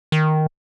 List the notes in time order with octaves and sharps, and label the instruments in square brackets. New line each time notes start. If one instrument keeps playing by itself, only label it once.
[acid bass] D#3